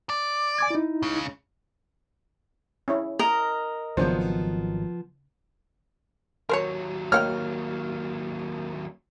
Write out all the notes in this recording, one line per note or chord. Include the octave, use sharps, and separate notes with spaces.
D5
G#5 D6 G#6
D#4 E4
C#2 C#3
C#4 E4 C#5
A#4 D#5
G#1 C#3 F3 F#3 B3 D4 C5
D#2 F#3 A#4 C5 C#5
A#3 C#5 F#5 G5 F6